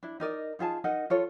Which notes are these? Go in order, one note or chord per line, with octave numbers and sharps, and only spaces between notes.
D4 E4
D#4 A#4 D5 D#5
D#4 F4 G#4 A5
D#4 A#4 D#5 F#5
F4 A4 C#5